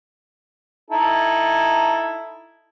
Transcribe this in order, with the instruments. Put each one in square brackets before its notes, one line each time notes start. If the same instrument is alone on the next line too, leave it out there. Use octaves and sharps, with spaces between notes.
[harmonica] D#4 E4 A4